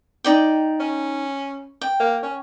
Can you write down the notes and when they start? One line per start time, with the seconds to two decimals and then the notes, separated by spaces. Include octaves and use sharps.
0.24 D#4 D5 G5
0.80 C#4
1.81 G5
2.00 A#3
2.23 C#4